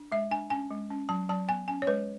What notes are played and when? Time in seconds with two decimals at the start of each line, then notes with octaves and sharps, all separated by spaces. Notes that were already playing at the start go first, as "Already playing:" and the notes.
Already playing: D4
0.12 G#3 E5
0.31 D4 G#5
0.50 C#4 G#5
0.71 G#3
0.90 C#4
1.09 F#3 A5
1.29 F#3 A5
1.48 B3 G#5
1.68 C#4 G#5
1.82 C#5
1.87 G#3 B4